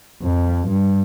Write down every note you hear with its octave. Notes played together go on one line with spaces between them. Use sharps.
F2
G2